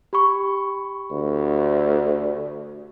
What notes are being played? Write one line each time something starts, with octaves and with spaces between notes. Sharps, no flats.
G4 B5 C#6
D2